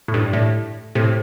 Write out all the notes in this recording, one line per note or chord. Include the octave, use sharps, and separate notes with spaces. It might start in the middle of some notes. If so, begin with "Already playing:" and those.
A2
G2
A2
A2 C3